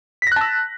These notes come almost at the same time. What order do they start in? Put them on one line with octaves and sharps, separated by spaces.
B6 A#6 F#6 A5 E6